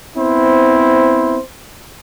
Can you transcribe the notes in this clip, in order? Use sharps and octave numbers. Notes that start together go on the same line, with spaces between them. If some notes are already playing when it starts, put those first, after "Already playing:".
B3 C4 E4 C5